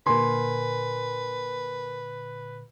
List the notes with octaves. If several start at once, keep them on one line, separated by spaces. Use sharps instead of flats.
A#2 D3 A#4 B4 G#5 C6